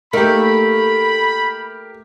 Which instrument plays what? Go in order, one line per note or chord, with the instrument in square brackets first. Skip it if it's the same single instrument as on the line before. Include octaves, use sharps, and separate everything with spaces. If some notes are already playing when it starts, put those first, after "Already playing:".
[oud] A3 A#3 D#4 [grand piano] G4 A#4 [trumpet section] B5